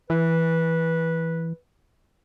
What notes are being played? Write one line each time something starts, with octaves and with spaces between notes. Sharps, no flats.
E3 B4